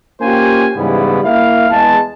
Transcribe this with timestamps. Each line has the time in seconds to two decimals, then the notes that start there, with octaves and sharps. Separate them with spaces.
0.21 A#3 C#4 F4 G4 C5 G#5
0.76 G#2 C#3 E3 G3 B3 E4
1.24 A#3 E4 E5 F5
1.71 E2 G#3 A5